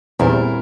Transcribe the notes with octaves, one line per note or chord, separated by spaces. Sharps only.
E2 A#2 G3 C4 E4 A#4